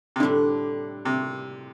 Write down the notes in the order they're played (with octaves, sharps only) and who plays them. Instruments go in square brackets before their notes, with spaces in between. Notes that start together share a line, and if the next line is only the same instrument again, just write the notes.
[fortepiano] C3
[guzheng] A2 G3 D4 [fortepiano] D3
[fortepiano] C3